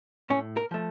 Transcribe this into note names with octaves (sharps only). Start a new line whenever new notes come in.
A2 C#4
A#4
F3 A3